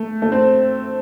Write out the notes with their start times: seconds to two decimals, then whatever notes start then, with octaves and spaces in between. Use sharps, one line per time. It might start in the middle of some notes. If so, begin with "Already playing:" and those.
Already playing: A3
0.22 A3
0.32 C4